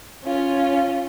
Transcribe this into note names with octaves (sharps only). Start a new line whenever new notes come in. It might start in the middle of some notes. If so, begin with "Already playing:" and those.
C#4 F4